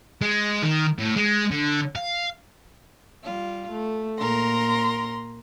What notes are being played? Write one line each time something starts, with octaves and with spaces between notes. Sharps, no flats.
G#3
D#3
A2
G#3
D3
F5
G3 F4
A3
A#2 A#4 A#5 C6